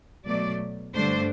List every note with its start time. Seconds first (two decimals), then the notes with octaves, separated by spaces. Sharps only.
0.25 B2 F#3 A3 D5
0.95 G2 D3 A3 D4 C5